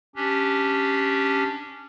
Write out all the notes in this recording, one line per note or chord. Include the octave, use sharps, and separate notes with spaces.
C#4 D4 G4